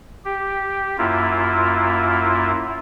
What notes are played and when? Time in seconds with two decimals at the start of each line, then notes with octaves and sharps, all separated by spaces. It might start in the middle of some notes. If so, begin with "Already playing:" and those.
0.25 G4
0.98 F#2 A#3 E4 F4